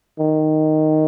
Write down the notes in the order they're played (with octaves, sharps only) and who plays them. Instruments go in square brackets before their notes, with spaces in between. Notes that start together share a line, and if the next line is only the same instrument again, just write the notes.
[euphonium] D#3